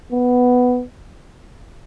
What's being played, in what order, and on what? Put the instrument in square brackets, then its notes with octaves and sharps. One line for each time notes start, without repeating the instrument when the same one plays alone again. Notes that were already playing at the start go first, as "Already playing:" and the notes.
[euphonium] B3